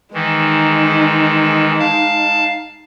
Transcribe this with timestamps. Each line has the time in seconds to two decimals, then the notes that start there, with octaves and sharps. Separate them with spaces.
0.14 D#3 E3 G#3 D#4
1.79 F5 A5